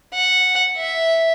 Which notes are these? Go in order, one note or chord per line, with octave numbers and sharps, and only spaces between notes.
F#5
E5